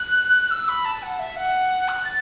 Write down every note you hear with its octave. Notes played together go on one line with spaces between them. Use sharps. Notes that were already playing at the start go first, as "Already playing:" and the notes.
Already playing: F#6
E6
B5
A5
F#5
E5
F#5
F#6
A6